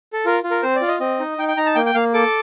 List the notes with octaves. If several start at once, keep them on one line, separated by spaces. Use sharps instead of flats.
A4
F4 A#4
F4
A#4
C4 C5
D5
F4
D#5
C4 D#5
D#4
D#4 G5
G5
D#4 A#5
A5
A#3 G5
G5
A#3 F5
A4 D6